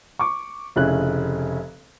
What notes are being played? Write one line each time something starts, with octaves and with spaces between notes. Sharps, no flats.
C#6 D6
F1 C#3 C#4 E4 F#6